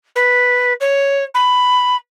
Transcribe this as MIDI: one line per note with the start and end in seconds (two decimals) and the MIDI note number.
0.15 0.73 71
0.80 1.24 73
1.34 1.96 83